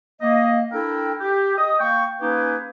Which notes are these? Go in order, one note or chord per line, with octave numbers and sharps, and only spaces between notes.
A#3 D#5
D4 E4 A4 A#4 G5
G4
D#5 D#6
A#3 G5 C#6
A#3 C#4 D#4 G4 G#4 B4